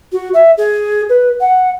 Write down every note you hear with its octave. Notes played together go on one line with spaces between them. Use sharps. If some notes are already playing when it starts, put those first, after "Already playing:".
F#4
E5
G#4
B4
F#5